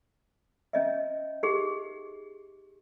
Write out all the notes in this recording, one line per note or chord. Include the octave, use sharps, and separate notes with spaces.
C#4 D#5 E5
D#4 G4 G#4